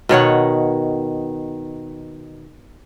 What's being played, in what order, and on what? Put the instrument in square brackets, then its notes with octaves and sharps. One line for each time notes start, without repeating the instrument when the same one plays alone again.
[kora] B2 D#3 C#5 F#5